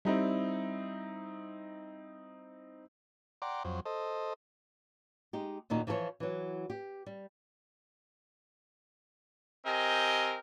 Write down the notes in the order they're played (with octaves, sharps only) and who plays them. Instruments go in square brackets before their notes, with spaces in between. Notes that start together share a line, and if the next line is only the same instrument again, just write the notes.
[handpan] G3 [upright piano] C4 D#4 E4
[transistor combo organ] D5 F#5 G5 A#5 C6 D6
F2 F#3 C5
A4 C5 D#5
[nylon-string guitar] G#3 D#4 G4
D#2 A#2 D#3 D#4 F#4
E3 F3 E4 A4 C#5
E3 F#3
G4
G3
[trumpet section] C4 G4 A#4 D#5 G#5